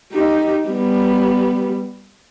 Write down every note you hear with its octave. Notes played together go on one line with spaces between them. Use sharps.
D#4 G4
G3 B3